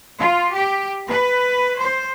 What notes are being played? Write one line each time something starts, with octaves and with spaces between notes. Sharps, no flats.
F4
G4
B4
C5